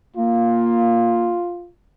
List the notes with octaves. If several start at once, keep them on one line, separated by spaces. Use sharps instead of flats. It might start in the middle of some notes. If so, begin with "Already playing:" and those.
A#3 F4